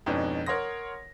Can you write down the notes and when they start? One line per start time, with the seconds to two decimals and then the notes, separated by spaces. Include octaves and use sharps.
0.06 F2 G#2 B2 C#4 D4
0.46 A#4 C#5 F#5 C6 D#6 A#6